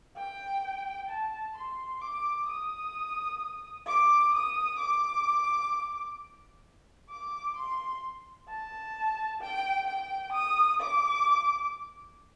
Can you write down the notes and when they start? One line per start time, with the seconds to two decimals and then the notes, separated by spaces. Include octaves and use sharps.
0.16 G5
1.09 A5
1.56 C6
2.01 D6
2.48 D#6
3.87 D6
4.33 D#6
4.79 D6
7.10 D6
7.56 C6
8.49 A5
9.41 G5
9.87 G5
10.33 D#6
10.80 D6